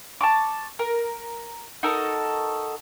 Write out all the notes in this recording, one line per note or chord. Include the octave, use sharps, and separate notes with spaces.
A5 C#6 D6
A#4
D#4 F#4 A4 A#4